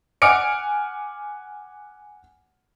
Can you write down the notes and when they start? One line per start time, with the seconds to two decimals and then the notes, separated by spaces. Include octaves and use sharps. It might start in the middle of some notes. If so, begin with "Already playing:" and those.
0.22 F#5 G#5 D6 F6 C#7 D7